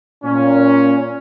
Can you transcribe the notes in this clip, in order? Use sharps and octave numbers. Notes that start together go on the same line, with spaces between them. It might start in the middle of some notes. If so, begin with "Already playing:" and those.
A#2 C#4